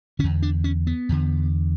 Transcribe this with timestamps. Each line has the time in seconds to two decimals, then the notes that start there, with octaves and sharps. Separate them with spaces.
0.19 D3 C#4
0.24 E2
0.42 D4
0.64 C#4
0.87 B3
1.09 E2 D3